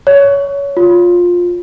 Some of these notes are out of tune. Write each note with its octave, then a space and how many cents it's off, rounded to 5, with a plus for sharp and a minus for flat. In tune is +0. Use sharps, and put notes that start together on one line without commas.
C#5 +20
F4 +15